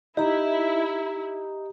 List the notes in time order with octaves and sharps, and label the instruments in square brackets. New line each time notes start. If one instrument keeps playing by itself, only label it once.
[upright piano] D#4 [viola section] E4 [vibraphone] G4 A#5